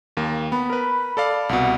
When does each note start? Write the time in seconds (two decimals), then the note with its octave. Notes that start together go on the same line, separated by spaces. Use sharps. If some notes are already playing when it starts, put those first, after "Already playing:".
0.17 D#2 A#3
0.52 B3 B5
0.70 A#4 B4
1.17 A4 D5 F5
1.49 C2 B2 F#5